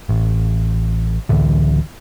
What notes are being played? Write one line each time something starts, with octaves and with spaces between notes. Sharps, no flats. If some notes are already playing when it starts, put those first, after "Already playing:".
A1
C#2 A2 D3 E3